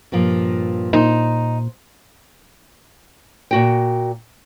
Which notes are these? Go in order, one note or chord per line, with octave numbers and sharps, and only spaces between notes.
G2 A#2 F3
A#2 D#4 C5
A#2 F#4 G5